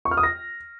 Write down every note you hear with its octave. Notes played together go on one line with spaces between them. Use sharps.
C#6
F6
D#6
A#6